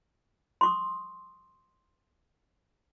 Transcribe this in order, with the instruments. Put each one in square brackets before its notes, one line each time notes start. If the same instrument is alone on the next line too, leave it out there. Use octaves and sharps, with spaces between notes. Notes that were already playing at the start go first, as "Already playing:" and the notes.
[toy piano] C6 C#6 D#6